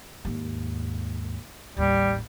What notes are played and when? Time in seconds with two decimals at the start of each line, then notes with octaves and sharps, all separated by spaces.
0.25 D#2 G#2
1.77 A1 D#2 G3